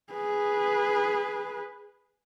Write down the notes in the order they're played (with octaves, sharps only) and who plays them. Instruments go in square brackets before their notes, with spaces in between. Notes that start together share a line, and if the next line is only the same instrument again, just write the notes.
[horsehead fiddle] G#4 B4